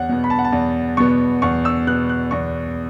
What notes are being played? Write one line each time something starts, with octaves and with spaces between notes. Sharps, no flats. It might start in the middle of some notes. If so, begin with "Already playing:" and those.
Already playing: E2 C#5 F#5
B2 B3
B5
A5
F#5
A5
E2
B2 B3 C#6
E2 C#6
E6
B2 B3 F#6
F#6
E2 C#6